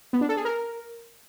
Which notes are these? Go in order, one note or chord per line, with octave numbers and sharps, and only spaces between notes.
B3
D4
A4
G#4
A#4